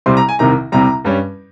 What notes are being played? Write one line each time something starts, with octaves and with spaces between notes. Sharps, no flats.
C2 C3 G3 C4 C6
A#5
G#5
C2 C3 D#3 A#5
C2 C3 G3 A#5
G2 G3 C#4